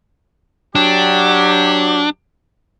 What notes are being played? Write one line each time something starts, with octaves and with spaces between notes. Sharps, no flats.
F#3 D4 G4